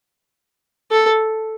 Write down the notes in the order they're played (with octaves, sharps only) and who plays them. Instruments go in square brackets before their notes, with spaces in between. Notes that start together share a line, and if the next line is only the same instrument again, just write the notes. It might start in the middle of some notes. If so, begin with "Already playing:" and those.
[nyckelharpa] A4